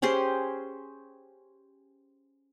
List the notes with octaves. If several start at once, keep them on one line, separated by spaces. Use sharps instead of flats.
C#4 G4 G#4 C5